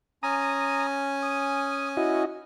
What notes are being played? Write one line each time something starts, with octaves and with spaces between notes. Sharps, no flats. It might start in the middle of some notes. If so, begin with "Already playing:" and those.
C#4 G#5 A#5 D#6
D#6
E4 F#4 D#5